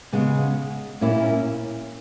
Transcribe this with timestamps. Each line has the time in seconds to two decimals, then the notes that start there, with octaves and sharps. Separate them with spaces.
0.13 C#3 G#3 B3
1.01 A#2 A#3 C#4 E4